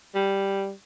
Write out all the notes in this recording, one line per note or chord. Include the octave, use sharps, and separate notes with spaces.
G3